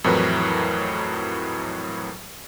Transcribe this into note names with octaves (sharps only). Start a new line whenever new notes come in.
F2 A2 E3 F#3 A#4 B4